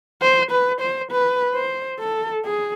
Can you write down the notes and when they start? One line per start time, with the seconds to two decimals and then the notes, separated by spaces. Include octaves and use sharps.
0.22 C5
0.51 B4
0.81 C5
1.11 B4
1.55 C5
1.99 A4
2.45 G#4